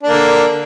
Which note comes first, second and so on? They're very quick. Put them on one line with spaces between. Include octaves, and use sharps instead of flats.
D4 A#3 D3